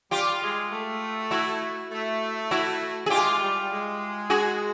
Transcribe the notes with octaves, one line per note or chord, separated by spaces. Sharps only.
G3 F4 G4
G#3
A3
E4 F#4
A3
E4 F#4
G#4
G#3 F4 G4
G3
G#3
F#4 G#4